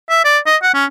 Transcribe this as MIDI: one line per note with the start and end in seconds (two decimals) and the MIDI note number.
0.09 0.19 76
0.24 0.38 74
0.46 0.56 75
0.63 0.71 78
0.74 0.85 61